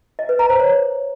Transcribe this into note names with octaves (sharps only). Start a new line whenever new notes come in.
D#5
B4
A#5
C5
C#5